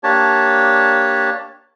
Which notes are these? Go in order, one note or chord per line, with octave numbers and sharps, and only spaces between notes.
A#3 D4 G4 C#5 A5